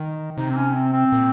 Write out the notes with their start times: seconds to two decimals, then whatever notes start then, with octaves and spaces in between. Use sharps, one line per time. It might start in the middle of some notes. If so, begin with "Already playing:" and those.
Already playing: D#3
0.37 C3 D#4
0.50 C4
0.57 C#4
0.75 C4
0.93 C4
1.12 A#2